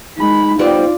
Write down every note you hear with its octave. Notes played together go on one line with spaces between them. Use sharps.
G#3 D#4 B5
G3 B3 C4 F4 D5